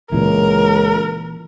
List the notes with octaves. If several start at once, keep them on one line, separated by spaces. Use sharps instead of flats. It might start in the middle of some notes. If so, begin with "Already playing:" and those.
C#2 A#2 E3 A#4